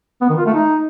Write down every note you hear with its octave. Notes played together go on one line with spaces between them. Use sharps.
B3
D#3
F4
A3
D#4